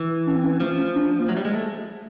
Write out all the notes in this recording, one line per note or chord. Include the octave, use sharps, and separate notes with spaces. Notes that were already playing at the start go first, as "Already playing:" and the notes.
Already playing: E3
C#4
C4
C#4
F3 A3
C#4
D4
A#3
F#3 A3
G3
G#3
A3